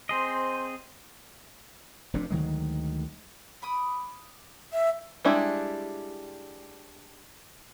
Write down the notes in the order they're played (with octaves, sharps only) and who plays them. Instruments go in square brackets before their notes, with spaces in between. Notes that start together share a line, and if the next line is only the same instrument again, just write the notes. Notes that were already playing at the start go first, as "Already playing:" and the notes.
[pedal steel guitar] C4 G#4 D#5 [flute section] C5 C6
[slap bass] F1 F2 C3 D4
D2 D#3 F#3 G#3
[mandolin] B5 D6 D#6
[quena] E5
[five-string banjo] G3 G#3 D4 E4 G4